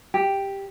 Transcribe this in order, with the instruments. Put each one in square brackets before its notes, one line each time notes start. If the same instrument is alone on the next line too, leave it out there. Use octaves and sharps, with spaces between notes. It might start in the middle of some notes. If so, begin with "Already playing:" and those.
[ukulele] G4